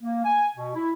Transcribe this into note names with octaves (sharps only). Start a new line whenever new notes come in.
A#3
G#5
B2
E4